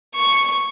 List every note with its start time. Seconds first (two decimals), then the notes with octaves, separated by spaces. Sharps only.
0.15 C#6